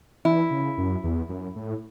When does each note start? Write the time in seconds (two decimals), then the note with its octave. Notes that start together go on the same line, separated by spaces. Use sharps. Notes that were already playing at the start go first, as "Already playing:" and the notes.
0.25 E3 E4
0.51 C#3
0.78 F#2
1.04 E2
1.29 F#2
1.56 A2